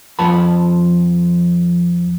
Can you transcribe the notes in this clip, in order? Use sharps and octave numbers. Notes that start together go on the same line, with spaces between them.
F2 F3 A5 B5